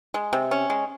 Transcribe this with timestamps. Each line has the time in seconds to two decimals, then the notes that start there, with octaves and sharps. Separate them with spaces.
0.14 G#3
0.33 C3
0.51 C#4
0.70 G#3